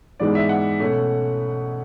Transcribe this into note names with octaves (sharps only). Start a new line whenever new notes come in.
G#2 E3 G#3 B3 D5
E5
F#5
B2 A3 C#4